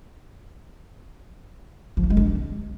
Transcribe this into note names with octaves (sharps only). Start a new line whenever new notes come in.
F3
A3
G#3
D4